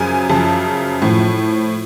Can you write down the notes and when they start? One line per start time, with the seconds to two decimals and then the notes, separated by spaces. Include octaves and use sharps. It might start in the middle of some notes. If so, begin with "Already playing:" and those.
Already playing: F#2 C#3 F3 G#5
0.29 F#2 C#3 F3 A5
1.02 A2 F3